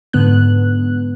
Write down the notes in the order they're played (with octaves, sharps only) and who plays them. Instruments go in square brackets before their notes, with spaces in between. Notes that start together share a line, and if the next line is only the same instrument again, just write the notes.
[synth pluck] G#2 D3 B3 F#6